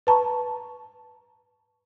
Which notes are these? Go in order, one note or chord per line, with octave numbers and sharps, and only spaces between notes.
B4 A5 A#5 C#6